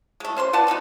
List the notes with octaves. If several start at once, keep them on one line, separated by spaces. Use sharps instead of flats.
G#3 A3
C#4 C5 F5 C6
B4 D5 F#5 A5
B3 C#4 D#4 F#4